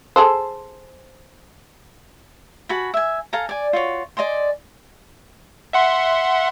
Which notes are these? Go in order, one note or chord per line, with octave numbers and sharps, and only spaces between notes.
G#4 A4 C5
F#4 G#5 A5 B5
E5 G#5
A4 F5 G#5 A#5
D5 G#5
F4 F#4 C#5
D5 D#5 G#5 C6
E5 F#5 C6